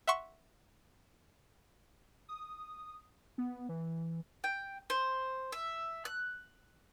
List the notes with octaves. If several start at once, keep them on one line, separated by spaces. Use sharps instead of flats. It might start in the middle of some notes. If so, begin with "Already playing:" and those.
E5 F#5 C6 C#6
D#6
B3
E3
G5
C5
E5
F#6